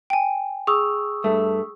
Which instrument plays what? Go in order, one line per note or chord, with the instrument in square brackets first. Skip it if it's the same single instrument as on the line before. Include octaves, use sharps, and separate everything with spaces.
[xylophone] G5 G#5
[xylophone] G#4 [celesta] C#6 D#6 E6
[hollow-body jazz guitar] G2 A3